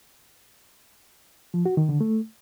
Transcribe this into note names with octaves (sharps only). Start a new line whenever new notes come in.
F3
F#4
D#3
D3
A3